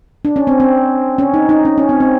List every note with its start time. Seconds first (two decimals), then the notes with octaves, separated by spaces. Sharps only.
0.25 D4
0.36 C#4
0.47 C4
0.60 C4
1.18 C#4
1.34 D#4
1.49 D#4
1.65 C#4
1.78 C#4
1.89 C4
2.00 C4